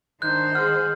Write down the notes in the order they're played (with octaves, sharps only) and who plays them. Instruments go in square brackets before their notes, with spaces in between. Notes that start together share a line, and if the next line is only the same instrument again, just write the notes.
[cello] D#3 C5 [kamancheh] D4 D#4 [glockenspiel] F#6 G6
[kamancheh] G#4 F#5 [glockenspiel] F6